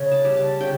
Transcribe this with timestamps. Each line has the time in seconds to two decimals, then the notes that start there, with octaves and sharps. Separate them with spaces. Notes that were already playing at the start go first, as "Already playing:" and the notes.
Already playing: C#3
0.11 A5
0.24 G3
0.36 A5
0.61 C#3 G5